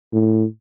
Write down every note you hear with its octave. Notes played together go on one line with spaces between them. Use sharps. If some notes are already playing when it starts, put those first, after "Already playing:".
A2